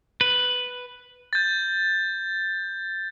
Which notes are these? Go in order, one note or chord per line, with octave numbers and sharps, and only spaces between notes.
B4
G6 A6